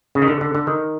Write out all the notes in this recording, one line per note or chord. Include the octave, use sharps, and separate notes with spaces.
C#3
D#3
D3
D3
D3
D#3